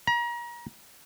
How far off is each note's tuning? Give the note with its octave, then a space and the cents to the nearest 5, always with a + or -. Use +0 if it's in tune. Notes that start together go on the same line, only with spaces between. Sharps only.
A#5 +35